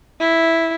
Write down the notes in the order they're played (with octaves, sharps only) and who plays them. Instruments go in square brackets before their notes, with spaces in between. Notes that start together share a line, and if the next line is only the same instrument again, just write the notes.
[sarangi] E4